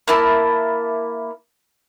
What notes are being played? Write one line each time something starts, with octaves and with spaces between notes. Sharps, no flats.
A#3 E4 A5